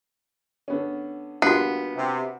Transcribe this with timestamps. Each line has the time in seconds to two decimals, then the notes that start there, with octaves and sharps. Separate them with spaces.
0.68 D3 B3 C#4
1.42 A#1 G3 B3 F4 F#4 F#5
1.97 C3